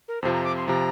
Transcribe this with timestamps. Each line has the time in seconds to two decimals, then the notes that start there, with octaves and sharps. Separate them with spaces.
0.08 A#4
0.22 F2 C3 F3 C5
0.34 A#5
0.45 D6
0.56 C6
0.68 C3 F3 A#5